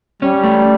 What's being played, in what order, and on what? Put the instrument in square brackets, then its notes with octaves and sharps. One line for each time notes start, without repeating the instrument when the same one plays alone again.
[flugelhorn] G3 [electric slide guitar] C#4
[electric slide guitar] A3